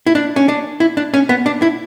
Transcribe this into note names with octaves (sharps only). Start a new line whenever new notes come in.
E4
D4
C#4
D4
E4
D4
C#4
B3
D4
E4